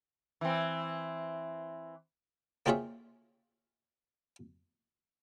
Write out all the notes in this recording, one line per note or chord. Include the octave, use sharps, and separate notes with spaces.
E3 C4
A#3 C4 F4 G#4 C#5 E5